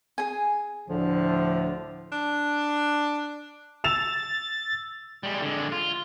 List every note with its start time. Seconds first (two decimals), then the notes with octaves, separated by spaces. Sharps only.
0.18 G#4 G#5
0.89 D2 A2 D3 F3
2.12 D4
3.84 E6 A6 E7 F7
5.23 G3 G#3
5.42 D3 G#3
5.72 F4